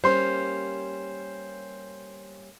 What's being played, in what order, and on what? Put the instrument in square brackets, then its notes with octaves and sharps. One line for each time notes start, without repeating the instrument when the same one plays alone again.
[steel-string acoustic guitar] G3 A#3 C#4 [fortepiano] C5 C6